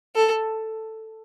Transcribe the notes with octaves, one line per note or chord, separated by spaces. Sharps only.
A4